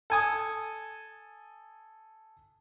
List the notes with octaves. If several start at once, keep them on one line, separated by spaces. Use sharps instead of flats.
A4 G#5 D#6